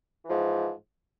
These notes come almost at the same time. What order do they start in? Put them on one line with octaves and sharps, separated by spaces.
E3 F3 G#2